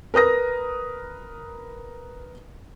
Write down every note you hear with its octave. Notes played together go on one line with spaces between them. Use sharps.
A#4 B4 D#6 A#6